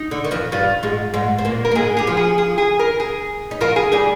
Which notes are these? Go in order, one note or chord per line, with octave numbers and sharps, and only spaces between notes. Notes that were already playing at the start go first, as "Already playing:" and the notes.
Already playing: D#4
D3
D#3
F2 F3
G2 G3 F4
G#2 G#3
G#2 G#3
C4
A#2 A#3
A#4
A#3
G#2 G#3 G#4
G4 G#4
F3 F4
G#4
G#4
G#4
A#4
G#4
D#4
F3 F4 A#4
G#4
G3 G4 G#4